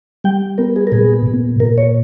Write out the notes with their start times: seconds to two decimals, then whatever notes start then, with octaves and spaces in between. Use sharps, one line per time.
0.24 G3 G5
0.58 B3 A#4
0.76 G#4
0.87 A#4
0.92 A#2 G#4
1.26 A#2
1.60 A#2 A#4
1.78 C#5